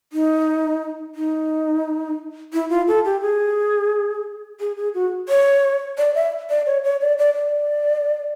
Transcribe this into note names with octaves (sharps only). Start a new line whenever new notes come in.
D#4
D#4
E4
F4
A4
G4
G#4
G#4
G#4
F#4
C#5
D5
E5
D5
C#5
C#5
D5
D5
D5